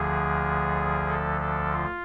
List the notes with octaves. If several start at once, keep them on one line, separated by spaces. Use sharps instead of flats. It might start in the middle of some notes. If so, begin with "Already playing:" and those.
Already playing: D2 D3 F3 G#4
A4
A4
F4